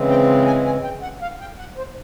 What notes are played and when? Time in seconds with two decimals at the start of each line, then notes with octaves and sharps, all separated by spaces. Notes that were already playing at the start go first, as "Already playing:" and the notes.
Already playing: C#3 E3 G#3 C4
0.10 G5
0.46 G#5
0.65 G#5
0.83 G5
1.02 F#5
1.22 F5
1.40 G5
1.59 F#5
1.77 C5